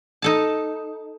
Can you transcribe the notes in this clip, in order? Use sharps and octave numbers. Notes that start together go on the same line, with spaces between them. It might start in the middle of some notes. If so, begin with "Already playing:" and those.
D#4 A4 A5